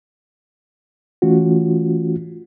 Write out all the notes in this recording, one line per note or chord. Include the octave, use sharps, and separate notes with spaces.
E3 A3 C#4 F4 F#4